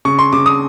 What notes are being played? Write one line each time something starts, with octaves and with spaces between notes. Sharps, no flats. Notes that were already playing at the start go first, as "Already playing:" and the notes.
C#3 C#6
C6
C#3 D6
D#6